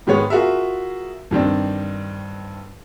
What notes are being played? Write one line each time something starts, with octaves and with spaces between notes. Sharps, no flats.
G#2 D#3 G#3 B3 C#5
F4 F#4 G#4 A#4 E5
G2 D#3 C4 D4